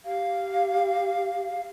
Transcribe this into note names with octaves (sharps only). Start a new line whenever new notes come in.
G4 F5